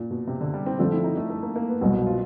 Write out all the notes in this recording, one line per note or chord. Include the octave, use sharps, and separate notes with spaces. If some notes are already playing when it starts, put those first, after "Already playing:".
Already playing: A#2
B2
C3
D3
G3
C4
D3 F3 A3 C4 D4
E4
D#4
A3
A3
A#3
A#3
B3
C2 B2 F#3 C4
F4